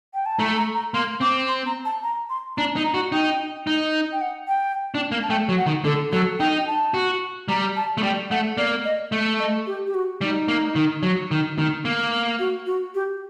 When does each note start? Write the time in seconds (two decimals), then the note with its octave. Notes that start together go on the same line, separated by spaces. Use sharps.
0.14 G5
0.26 A5
0.39 A3 A#5
0.57 A#5
0.75 A#5
0.94 A#3 C6
1.21 C4 D6
1.48 C6
1.66 A#5
1.85 A5
2.03 A#5
2.30 C6
2.57 D4 A#5
2.76 D#4
2.84 A#5
2.94 F#4
3.12 D#4 G5
3.67 D#4
4.12 G5
4.21 F#5
4.48 G5
4.95 D4
5.12 A#3
5.23 A5
5.30 A3 G5
5.49 F#3
5.57 F#5
5.66 D#3
5.84 D3 A4
6.12 F#3 A4
6.39 D#4 G5
6.58 G5
6.67 A5
6.94 F#4
7.48 G3 A#5
7.76 A5
7.98 A3
8.03 G3 G5
8.31 A3 F#5
8.57 A#3 D5
8.84 D#5
9.12 A3
9.40 D#5
9.67 G4
9.86 G4
9.94 F#4
10.21 G3 D#4
10.48 A#3
10.76 D#3
11.03 F#3
11.31 D#3
11.59 D#3
11.85 A#3
12.39 F#4
12.67 F#4
12.95 G4